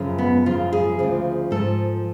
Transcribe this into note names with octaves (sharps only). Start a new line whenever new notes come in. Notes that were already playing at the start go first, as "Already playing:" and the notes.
Already playing: F#2 C#3 F3
B3
F#2 C#3 F3 F4
G#4
D2 C#3 F3
G#2 F3 A4